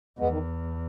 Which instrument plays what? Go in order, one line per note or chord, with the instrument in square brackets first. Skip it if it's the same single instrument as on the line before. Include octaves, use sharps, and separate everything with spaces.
[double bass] E2 [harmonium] G#3 B3
[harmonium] D#3